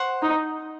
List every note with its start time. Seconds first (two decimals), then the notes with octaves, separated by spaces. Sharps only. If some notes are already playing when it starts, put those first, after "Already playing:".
Already playing: C5 F#5 C#6
0.22 D#4